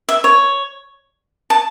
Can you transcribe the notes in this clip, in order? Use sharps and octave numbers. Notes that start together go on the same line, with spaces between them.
E5
C#5
A5